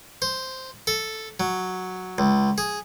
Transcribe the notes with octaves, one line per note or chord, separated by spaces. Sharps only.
C5
A4
F#3
C#2
G#4